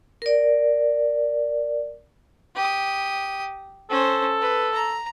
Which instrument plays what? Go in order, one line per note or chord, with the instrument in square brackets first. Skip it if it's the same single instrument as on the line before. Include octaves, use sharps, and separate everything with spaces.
[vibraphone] A#4 D5
[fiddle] G4 D#6
[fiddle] C#4 C5 [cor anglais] A4
[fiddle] B4
A#5